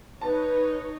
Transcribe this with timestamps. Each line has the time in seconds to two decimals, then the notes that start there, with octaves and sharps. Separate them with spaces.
0.21 D#4 B4 C#5 A5